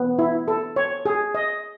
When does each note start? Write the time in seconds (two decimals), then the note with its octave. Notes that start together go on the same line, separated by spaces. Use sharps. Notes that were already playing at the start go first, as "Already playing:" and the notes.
Already playing: B3
0.19 E4
0.48 A4
0.76 C#5
1.06 G#4
1.35 D#5